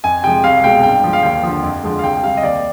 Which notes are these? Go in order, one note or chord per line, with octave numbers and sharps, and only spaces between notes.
F2 G#5
C3 F3 G#3 G5
C2 F5
B2 G#3 G5
G2 G5
F3 G#3
F5
D#2 G5
D3 F3
F2
D3 F3 G#3
F5
C2 G5
C3 G3 F5
D#5
D#2 D5